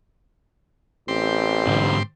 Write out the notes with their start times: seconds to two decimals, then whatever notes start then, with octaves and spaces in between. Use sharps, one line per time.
1.08 A1 C4 G4 C6
1.67 G#2 D3